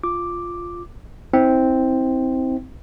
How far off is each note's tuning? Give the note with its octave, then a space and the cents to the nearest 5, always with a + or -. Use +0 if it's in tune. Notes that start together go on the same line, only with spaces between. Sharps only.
F4 +0 D6 +0
C4 +0 E4 -40